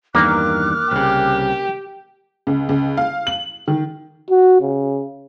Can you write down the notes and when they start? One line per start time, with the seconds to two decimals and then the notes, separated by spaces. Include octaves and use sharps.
0.15 E2 G2 D#3 A#3 D6 F6 F#6
0.91 C2 C#3 G4
2.47 C#2
2.69 C#2
2.97 F5
3.27 F#7
3.68 D#3
4.30 F#4
4.61 C#3